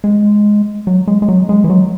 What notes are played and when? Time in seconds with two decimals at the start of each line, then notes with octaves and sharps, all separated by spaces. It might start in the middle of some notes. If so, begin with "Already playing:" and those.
0.04 G#3
0.87 F#3
1.07 G#3
1.22 G#3
1.29 F#3
1.49 G#3
1.64 E3
1.70 F#3